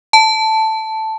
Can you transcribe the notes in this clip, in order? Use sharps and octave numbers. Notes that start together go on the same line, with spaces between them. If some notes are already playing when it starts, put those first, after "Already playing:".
A5